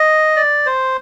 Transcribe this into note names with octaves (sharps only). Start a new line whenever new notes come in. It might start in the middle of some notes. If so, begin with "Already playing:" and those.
Already playing: D#5
D5
C5